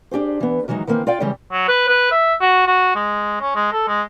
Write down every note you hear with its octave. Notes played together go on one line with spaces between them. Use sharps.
D4 G4 G#4 C5
E3 B3
D#3 E3 F#3 G#3 D#4
D#3 E3 A#3 C4
F4 D5 F5 G5
C#3 E3 G3 G#3 G4
F#3
B4
B4
E5
F#4
F#4
G#3
C#4
G#3
A4
G#3